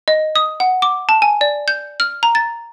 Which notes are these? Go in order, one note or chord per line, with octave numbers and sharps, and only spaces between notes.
D#5
D#6
F#5
D6
A5
G#5
D5
G6
F6
A#5
A6